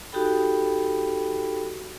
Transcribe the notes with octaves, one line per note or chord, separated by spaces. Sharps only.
D#4 F#4 G4 A4 G5 B5